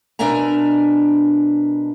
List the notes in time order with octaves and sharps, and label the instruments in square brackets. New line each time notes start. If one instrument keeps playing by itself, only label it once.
[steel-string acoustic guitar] B2 D4 A#4 E5 G#5 A#5